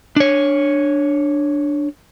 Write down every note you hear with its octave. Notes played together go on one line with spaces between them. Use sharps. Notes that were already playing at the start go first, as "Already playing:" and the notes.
D4 C#5